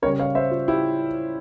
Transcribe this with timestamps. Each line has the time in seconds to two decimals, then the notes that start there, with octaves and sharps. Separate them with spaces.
0.02 C#3 G3 C#4 A#4 C#5
0.20 C#5 F5
0.35 C5 E5
0.51 F4
0.68 E4 G4